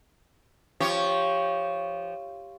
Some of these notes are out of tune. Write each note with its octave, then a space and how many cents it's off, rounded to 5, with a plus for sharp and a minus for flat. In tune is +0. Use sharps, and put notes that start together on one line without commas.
F3 -15 G4 +0 C#5 +0